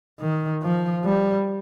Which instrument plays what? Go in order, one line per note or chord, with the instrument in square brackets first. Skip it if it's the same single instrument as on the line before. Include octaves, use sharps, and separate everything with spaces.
[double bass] D#3
F3
G3